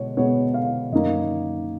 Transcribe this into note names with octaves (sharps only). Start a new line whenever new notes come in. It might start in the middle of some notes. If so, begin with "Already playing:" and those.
Already playing: B2 G#3 B3 C#5
B2 G#3 B3 C#5
F5
F#2 D#3 A#3 D#5